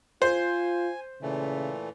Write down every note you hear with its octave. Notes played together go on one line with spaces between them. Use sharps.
F4 C5 G#5
A#2 C#3 E3 A3